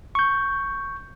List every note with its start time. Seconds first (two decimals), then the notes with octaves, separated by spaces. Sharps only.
0.15 C#6 G6